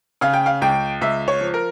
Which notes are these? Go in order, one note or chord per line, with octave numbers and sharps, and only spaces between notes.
C#3 F5
G5
F5
C#2 G5
C#2 E5
C#5
F3
A#4